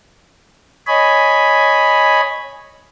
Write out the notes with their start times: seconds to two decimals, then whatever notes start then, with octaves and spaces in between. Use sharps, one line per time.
0.87 C#5 D#5 G#5 B5